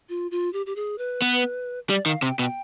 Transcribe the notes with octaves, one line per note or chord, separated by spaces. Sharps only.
F4
F4
G4
G4
G#4
B4
B3
G3 D5
D#3 F5
C3 G5
B2 G5